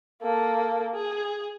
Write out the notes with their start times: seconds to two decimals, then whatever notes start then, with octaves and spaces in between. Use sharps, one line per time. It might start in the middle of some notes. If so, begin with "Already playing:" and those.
0.22 A#3 A4
0.95 G#4